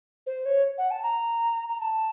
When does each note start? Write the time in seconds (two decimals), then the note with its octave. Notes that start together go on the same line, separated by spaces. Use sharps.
0.27 C5
0.45 C#5
0.78 F#5
0.91 A5
1.03 A#5
1.69 A#5
1.80 A5